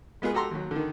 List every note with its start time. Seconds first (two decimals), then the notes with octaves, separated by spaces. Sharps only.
0.22 G#3 B3 F4 G#4 B4
0.33 F#4 G4 A4 A#5 C6
0.51 D#2 F#3
0.71 D3 D#3